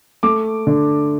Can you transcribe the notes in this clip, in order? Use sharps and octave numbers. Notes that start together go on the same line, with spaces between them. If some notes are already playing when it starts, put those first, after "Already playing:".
A3 D6
D3